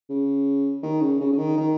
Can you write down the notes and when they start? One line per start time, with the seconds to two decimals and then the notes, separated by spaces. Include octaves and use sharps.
0.10 C#3
0.83 D#3
1.01 C#3
1.21 C#3
1.33 C#3
1.38 D#3
1.58 D#3